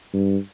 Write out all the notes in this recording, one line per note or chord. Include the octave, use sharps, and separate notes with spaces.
G2